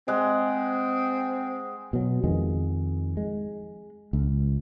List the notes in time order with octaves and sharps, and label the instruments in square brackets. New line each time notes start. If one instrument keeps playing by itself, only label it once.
[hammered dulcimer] G#3 F#5 [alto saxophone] C4
[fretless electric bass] B2 F#3
F2 D#3 G#3
G#3
C#2